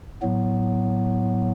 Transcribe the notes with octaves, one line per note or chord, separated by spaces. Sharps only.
A2 F#3 B3